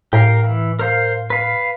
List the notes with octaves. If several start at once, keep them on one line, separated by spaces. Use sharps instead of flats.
A2 G4 A#4 F5
E3
A#4 C5 F5
B4 F5